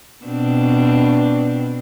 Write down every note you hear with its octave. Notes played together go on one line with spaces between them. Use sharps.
B2 C4 D4